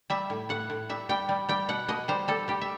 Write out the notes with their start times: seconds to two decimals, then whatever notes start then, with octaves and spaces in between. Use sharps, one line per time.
0.10 G3 E5
0.30 A2
0.49 A2 F#5
0.70 A2
0.89 G3 E5
1.09 G3 G5
1.29 G3
1.49 G3 G5
1.69 B2 F#5
1.88 B2 D#5
2.08 G3 C5
2.28 G3 A4
2.48 G3 G4
2.61 E5